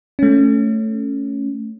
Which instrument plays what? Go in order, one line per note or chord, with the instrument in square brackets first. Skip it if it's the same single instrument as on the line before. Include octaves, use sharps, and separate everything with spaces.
[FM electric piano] A3 C#4